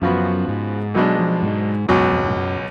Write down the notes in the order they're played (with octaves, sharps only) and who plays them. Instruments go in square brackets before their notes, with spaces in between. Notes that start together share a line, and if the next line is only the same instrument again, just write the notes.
[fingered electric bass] F#2 [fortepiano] C#3 F3 B3 F#4
[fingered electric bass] G#2
[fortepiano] B1 B2 G#3 D4 [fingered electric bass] F#3
[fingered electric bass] F3
G#2
[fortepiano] C#2 B2 F#3 [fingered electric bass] F#2
[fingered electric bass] F#2
F2
F#2
G#2
F#2